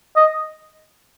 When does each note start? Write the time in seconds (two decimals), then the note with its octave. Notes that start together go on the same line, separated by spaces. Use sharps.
0.16 D#5